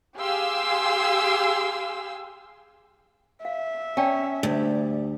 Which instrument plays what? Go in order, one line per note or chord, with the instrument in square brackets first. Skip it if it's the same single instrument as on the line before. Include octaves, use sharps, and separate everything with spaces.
[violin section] G4 G#4 F5 G#5 C6 E6
[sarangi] E5 [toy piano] F5
[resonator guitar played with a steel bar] C#4 [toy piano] D5 G5 A5
[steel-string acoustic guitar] D2 [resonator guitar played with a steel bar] G3